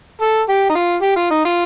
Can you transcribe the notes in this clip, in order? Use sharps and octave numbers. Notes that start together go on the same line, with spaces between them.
A4
G4
D#4
F4
G4
F4
D#4
F4